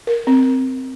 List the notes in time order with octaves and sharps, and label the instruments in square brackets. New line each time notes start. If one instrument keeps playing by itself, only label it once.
[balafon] A#4
C4